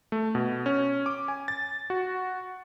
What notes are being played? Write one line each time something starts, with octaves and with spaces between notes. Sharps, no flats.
A3
B2
C#4
D6
G#5
A6
F#4